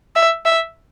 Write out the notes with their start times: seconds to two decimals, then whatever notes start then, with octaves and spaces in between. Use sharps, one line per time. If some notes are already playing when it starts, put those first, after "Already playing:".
0.16 E5
0.46 E5